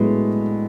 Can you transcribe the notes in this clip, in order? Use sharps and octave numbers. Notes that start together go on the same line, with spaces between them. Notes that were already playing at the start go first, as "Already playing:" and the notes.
Already playing: A2 F#3 G#3 B3 D4